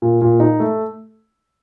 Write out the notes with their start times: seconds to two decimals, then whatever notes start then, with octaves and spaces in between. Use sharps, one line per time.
0.02 A#2
0.22 A#2
0.40 D#4
0.60 A3